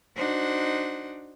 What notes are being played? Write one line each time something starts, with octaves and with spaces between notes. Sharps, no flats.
D4 D#4 F#4 C5 F#5